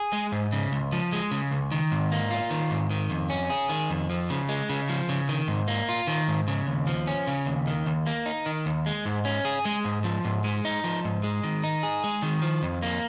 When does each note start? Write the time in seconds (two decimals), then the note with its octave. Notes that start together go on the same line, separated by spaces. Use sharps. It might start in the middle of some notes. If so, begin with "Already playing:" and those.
Already playing: G#4
0.13 G#3
0.32 G#2
0.52 C#3
0.72 C#2
0.92 F3
1.12 G#3
1.31 C#3
1.51 C#2
1.72 D#3
1.91 G#2
2.12 A#3
2.31 F4
2.50 D#3
2.71 G#2
2.90 D#3
3.10 F2
3.30 C#4
3.50 G#4
3.69 D#3
3.90 F2
4.10 F3
4.30 C#3
4.49 G#3
4.69 C#3
4.89 F3
5.09 C#3
5.29 D#3
5.48 G#2
5.68 A#3
5.89 F4
6.07 D#3
6.28 G#2
6.48 C#3
6.67 D#2
6.87 F3
7.07 C#4
7.27 C#3
7.46 D#2
7.67 D#3
7.86 D#2
8.06 A#3
8.26 D#4
8.46 D#3
8.66 D#2
8.86 G#3
9.05 G#2
9.25 C#4
9.45 G#4
9.65 G#3
9.85 G#2
10.04 F3
10.25 G#2
10.44 G#3
10.65 D#4
10.84 F3
11.05 G#2
11.23 G#3
11.44 D#3
11.64 D#4
11.83 G#4
12.04 G#3
12.22 D#3
12.42 F3
12.63 F2
12.82 A#3